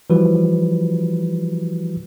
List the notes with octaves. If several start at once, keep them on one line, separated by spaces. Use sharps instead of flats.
E3 F3 G3 F#4 B4